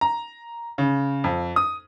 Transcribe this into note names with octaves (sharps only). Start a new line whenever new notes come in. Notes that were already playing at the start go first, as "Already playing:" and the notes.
A#5
C#3
F2
D#6